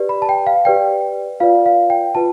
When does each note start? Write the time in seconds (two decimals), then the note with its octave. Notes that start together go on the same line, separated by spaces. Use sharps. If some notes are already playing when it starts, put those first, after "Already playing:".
Already playing: G4 B4 D5
0.09 B5
0.22 A5
0.29 G5
0.47 F5
0.65 G4 B4 D5 G5
1.40 F4 B4 D5 F5
1.66 F5
1.90 G5
2.15 F4 B4 A5